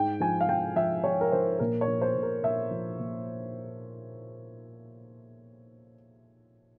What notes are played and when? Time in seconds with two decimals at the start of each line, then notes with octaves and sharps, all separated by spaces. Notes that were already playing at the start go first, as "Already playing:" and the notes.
Already playing: G#2 G5
0.20 F3 G#5
0.41 F5
0.49 F3 G5
0.76 F3 E5
1.04 F3 C#5
1.21 A#4
1.32 F3 C5
1.59 A#2 A#4
1.81 C#5
1.87 F3
2.01 C5
2.15 A#2
2.23 A#4
2.43 A#2 E5
2.71 F3
2.99 A#2